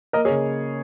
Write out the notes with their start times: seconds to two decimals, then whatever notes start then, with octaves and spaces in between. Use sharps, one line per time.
0.13 A#3 A#4 D#5
0.25 G#4 C#5
0.29 C#3